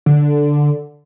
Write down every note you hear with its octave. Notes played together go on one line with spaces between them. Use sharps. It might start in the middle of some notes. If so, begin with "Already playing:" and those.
D3